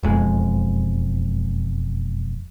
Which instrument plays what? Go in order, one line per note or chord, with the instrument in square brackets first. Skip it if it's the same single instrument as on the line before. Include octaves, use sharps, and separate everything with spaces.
[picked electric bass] E1 F2 G#3